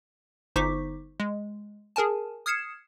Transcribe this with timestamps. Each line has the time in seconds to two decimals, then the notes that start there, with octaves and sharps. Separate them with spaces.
0.56 G1 D#4 C5 C#6 D6 B6
1.20 G#3
1.96 G#4 A#4 G#5 A5
2.46 D#6 F6 G#6 C7 C#7 E7